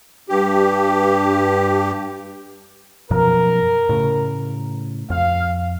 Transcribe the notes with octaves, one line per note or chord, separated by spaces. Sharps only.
G2 G4
F#2 B2 F3 A#4
A2 C#3
F2 F5